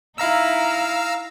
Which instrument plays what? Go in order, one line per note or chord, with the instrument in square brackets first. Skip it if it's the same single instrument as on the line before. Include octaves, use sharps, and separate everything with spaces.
[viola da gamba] D#4 E4 [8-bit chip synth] F5 A#5 E6